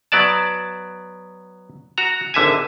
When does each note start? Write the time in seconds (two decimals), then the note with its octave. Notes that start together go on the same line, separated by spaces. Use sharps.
0.12 F#3 B3 D5 A5
1.98 F#4 A#5
2.34 G#1 D3 E5 G#5